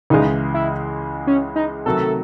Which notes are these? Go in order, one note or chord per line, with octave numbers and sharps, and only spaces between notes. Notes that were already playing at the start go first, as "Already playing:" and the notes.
C#2 C#3 E3 G#3 D#4
E4
C#4
D#4
C3 D#3 F#3 A3 A4